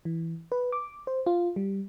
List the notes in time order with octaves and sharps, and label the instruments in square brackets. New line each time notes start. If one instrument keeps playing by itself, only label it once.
[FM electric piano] E3
B4
D6
C5
F4
G3